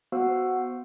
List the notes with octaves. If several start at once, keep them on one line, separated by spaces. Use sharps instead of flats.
B3 F#4 C5 F5 F#5 E6